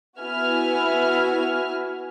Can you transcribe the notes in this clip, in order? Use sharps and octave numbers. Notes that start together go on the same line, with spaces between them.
B3 E4 F#4 E5 G#5 F6